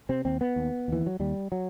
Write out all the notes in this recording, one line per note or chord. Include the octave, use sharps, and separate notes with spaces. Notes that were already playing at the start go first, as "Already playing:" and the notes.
C3 C4
D#2 C4
B3
D#2
D#2 E3
F#3
D#2 G3
F#3